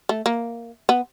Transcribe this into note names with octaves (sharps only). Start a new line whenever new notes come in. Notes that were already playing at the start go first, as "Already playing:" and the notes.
A3
A#3
B3